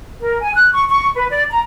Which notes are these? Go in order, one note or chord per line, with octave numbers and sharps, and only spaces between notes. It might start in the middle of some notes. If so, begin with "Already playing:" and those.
A#4
G#5
F#6
C#6
C#6
B4
D5
A#5